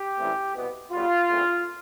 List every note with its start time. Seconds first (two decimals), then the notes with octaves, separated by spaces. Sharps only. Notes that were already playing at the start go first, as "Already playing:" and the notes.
Already playing: G4
0.18 A1 G2 E3 A3 C4
0.55 C2 B2 B3
0.92 B1 B2 G3 B3 F4
1.29 E2 D3 A3 C4